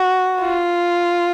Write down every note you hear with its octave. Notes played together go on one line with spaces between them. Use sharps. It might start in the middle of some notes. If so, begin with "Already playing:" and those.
Already playing: F#4
F4